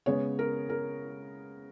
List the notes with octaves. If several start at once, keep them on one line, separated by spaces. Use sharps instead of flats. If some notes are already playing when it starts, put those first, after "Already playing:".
C#3 G#3 B3 C#5
A#4
A#4